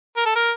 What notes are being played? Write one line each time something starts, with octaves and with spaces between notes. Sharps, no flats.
A#4
A4
A#4